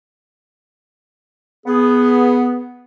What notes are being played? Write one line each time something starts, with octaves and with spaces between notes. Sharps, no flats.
B3 G#4